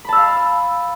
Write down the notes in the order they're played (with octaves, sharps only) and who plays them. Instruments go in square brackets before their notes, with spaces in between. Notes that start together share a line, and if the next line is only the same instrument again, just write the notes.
[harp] B5
A5
E6
F5